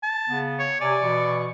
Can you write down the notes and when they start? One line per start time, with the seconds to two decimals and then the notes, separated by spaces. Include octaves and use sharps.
0.03 A5
0.29 C#3 B3
0.59 C#5
0.80 C3 D5 G#5
1.01 B2 E3 C#6